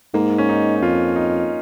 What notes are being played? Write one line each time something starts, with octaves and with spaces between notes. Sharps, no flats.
G#2 A#3
C#4
D#4
D#4
F2 F4
D#4